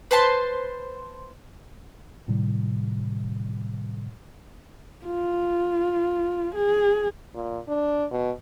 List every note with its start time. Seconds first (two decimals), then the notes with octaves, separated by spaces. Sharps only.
0.11 B4 C5 A5 C6
2.28 A2 C3 D#3 G3
5.06 F4
6.55 G#4
7.34 A#2
7.68 D4
8.11 B2